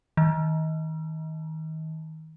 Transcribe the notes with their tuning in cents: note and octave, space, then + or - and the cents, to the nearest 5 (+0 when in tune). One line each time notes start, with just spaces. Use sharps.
D#3 +30